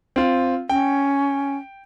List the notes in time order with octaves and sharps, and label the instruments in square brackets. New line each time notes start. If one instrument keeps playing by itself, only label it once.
[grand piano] C4 F4
[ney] C#4 [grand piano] G5